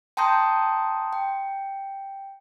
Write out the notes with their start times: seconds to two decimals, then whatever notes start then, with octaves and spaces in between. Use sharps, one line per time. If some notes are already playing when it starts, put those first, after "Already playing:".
0.17 G5 A5 A#5 C6 D#6 G6
1.13 G5